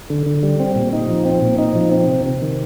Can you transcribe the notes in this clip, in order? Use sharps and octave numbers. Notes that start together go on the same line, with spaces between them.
D3
D3
G3
C4
A#2
D#4
F3
C4
A#2
D#4
F3
C4
C3
C3
D#3